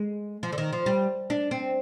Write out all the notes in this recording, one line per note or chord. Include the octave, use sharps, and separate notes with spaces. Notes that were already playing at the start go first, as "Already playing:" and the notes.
Already playing: G#3
F3
D3
D#3
F3
G3
D4
C4